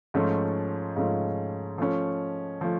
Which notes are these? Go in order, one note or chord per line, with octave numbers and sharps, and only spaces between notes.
G#2 F3 A3 C#4 F4
G#2 F3 A3 C#4 F4
F3 A3 C#4
F3 A3